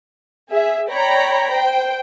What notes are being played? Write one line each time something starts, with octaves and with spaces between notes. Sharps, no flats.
G#4 E5
C#5 D5 G5 A#5 B5
C5 G5